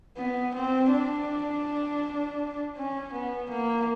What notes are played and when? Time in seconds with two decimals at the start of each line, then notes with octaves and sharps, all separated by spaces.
0.17 B3
0.55 C4
0.92 D4
2.76 C#4
3.13 B3
3.51 A#3